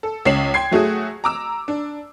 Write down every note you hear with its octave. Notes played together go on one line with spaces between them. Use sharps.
A4
C#2 C#4 C#5 C7 E7 F#7
G5 C6 G#6 C7
F#3 A3 F#4 G#4
A#5 D6 E6
D4